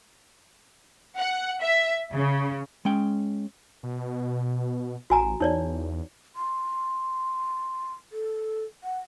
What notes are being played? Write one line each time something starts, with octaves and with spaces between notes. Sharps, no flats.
F#5
E5
C#3
G#3 C#4 G5
B2
A1 F#4 G#5 A#5
E2 D#4 C#5 D5
C6
A4
F#5